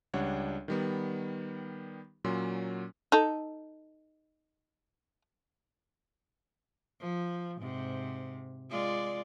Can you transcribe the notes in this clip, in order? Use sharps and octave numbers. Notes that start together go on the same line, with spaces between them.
C#2 G3 D4 C#5 F#5
D#3 G3 B3
A#2 F#3 C#4 C6
D#4 A4
F3
G#2 C3
G#3 F4 D5